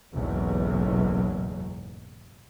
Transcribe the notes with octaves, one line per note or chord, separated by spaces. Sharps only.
F#1 B1 E2 G#2 B2 F#3